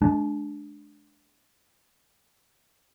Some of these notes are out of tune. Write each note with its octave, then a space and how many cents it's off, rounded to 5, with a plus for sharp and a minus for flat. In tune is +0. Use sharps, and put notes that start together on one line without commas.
G#3 +35 D4 +0